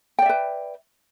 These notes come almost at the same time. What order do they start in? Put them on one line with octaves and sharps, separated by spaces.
G5 D5 E5 B4